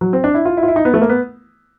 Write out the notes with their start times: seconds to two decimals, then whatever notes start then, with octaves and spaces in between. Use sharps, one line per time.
0.01 F#3
0.13 C4
0.24 D4
0.34 E4
0.45 F4
0.57 E4
0.63 F4
0.68 E4
0.76 D#4
0.85 B3
0.94 A3
1.02 A#3
1.09 B3